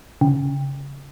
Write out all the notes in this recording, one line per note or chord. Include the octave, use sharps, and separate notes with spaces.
C#3